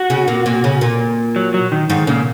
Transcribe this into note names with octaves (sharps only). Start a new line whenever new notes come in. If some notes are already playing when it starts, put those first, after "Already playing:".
Already playing: F#4
C#3
A#2
A#2
C#3
A#2
F#3
F#3
D#3
G#2 D#3
A#2 C#3